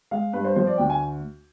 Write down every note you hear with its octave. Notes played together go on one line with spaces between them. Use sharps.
G#3 F5
G2 B4
C5
F3 C5
D5
D2 G5
G#5